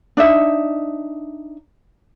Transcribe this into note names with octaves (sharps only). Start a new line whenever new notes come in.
D4 D#4 E5